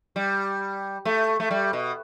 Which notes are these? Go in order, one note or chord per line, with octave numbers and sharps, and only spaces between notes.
G3
A3
A3
G3
B2